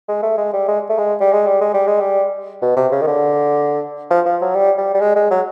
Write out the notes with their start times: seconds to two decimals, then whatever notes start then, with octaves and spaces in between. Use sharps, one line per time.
0.08 G#3
0.23 A3
0.38 G#3
0.53 G3
0.68 G#3
0.89 A3
0.98 G#3
1.20 G3
1.33 G#3
1.47 G3
1.61 G#3
1.74 G3
1.87 G#3
2.00 G3
2.62 B2
2.76 C3
2.92 C#3
3.01 D#3
3.07 D3
4.10 F3
4.25 F3
4.41 F#3
4.55 G3
4.78 G3
4.94 G3
5.00 G#3
5.15 G#3
5.31 F#3